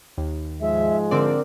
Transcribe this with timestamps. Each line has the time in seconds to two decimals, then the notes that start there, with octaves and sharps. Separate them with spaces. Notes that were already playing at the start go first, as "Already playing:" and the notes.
0.18 D#2
0.61 G#2 F3 G#3 E5
1.11 D3 C4 A#4 D5